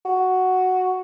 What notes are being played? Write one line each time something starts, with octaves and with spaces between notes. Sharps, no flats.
F#4